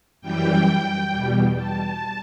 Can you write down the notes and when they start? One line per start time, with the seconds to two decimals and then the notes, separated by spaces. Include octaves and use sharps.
0.21 F#2 E3 G3 G5
1.11 E2 B2 G3
1.56 A5